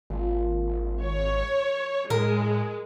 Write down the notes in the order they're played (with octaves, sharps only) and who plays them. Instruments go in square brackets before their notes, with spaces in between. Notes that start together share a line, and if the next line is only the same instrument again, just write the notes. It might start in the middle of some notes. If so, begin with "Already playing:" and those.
[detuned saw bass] G#1 [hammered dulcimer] A#2 F3 C6
[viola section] C#5
[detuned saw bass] A2 [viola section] G#3 [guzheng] A#4